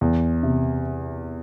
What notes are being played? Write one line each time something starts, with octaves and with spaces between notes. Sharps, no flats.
E2
C3